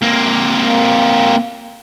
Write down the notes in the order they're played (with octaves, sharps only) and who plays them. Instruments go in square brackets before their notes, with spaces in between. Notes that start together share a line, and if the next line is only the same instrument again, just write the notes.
[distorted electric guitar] A#3 C4